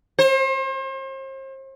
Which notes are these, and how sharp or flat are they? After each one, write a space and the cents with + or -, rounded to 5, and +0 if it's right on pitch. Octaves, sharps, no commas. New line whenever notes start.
C5 +40